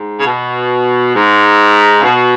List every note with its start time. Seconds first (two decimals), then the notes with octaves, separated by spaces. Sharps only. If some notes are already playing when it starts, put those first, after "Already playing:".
Already playing: G#2
0.18 C#3
0.24 B2
1.14 G#2
1.98 C#3
2.03 B2